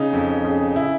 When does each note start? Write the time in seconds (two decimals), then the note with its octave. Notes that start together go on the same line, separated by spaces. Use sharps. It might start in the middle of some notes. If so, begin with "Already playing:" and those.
Already playing: C#3 D#4
0.13 F2
0.45 C#3
0.76 C#3 E4